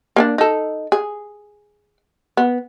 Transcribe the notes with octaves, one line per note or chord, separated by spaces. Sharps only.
A#3 C#4 D4
D#4 A4
G#4
B3